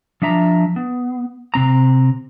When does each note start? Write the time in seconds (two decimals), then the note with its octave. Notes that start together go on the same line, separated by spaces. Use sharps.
0.22 F3 D4 E5 A#5
0.76 B3
1.54 C3 C4 A#5